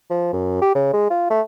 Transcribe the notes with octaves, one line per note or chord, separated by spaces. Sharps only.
F3
F#2
G4
C#3
G#3
F4
A3